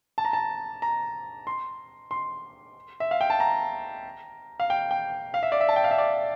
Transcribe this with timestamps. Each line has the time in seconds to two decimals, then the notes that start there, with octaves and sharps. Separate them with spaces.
0.18 A5
0.25 A#5
0.33 A5
0.82 A#5
1.47 C6
2.11 C6
3.00 E5
3.11 F5
3.21 G5
3.30 A5
3.40 A#5
4.60 F5
4.70 G5
4.91 G5
5.34 F5
5.43 E5
5.52 D5
5.61 E5
5.69 A5
5.76 G5
5.84 F5
5.91 E5
5.98 D5